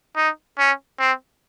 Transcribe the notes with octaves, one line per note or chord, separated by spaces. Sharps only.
D#4
C#4
C4